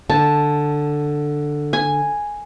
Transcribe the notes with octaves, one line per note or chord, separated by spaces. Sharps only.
D3 A5
G#5